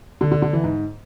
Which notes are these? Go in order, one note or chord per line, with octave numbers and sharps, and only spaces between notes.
D3
D3
D3
E3
G#2